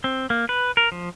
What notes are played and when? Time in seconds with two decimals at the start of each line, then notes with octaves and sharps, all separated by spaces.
0.04 C4
0.30 A#3
0.49 B4
0.77 A#4
0.92 F3